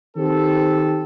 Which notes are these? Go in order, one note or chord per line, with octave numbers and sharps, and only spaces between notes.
D#3 C4 G4 A4